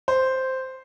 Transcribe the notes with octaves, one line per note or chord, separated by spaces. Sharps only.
C5